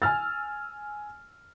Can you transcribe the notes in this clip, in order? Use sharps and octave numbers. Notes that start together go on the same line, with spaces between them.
G#5 E6 F6 A6